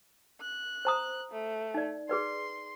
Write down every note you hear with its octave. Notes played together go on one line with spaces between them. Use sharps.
F#6
C5 A#5 D#6
A3
D#4 D5
G#4 B4 D5 C6